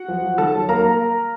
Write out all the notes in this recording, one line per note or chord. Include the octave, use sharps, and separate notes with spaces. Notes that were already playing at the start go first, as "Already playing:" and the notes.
Already playing: F#4 F#5
F3
F3
D#3 A4 A5
F#3
A#3 A#4 A#5
A#3